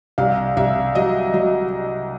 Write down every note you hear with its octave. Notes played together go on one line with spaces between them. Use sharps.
C2 F5
C2 E5
F#3 D#5
F#3